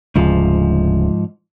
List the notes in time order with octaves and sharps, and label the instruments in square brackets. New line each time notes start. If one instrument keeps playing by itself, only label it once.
[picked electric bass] D1 D2 C#3 [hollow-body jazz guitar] G#2 F3